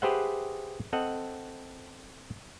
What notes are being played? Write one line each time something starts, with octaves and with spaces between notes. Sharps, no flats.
G4 G#4 B4 C5 E5 F#5
C4 A4 D#5 F#5